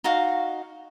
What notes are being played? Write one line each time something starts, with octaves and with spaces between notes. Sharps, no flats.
D#4 F#4 F5